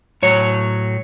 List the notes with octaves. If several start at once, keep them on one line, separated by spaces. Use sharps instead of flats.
A2 F#3 C#5